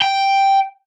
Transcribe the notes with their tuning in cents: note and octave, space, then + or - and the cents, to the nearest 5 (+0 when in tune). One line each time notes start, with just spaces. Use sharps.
G5 +0